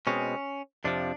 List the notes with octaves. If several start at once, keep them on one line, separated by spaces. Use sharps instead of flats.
B2 G#3 C4 C#4
F2 C3 F3 D4